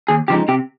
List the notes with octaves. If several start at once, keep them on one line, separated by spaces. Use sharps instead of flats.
D#2 G#4
C#3 F3 G#3 D#4 G4
C3 G4